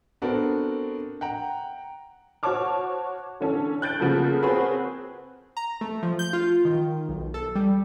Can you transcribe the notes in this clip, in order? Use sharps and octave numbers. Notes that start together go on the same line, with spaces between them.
B3 C4 D4 F#4 A4 A#4
F#5 G5 A#5
F#4 C5 C#5 A5 D6 F6
D3 E3 C#4 D4 A4
F#6 G6 A6 D7
C#3 F3 A#3 B3 A4
C4 F#4 G#4 A#4 B4 C#5
A#5
A3
F3
G6
F4
D#3
B1
A4
G3